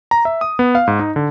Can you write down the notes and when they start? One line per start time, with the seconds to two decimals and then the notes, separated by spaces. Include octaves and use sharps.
0.11 A#5
0.25 E5
0.41 D#6
0.59 B3
0.75 F5
0.87 G#2
0.99 D#4
1.16 D3